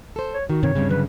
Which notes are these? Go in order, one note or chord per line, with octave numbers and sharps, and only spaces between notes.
A4 C5
C#5
D#3 F#4
G2 C3 C4 C#5
D2 G2 C#3 G3 C4
D3 F#3 B4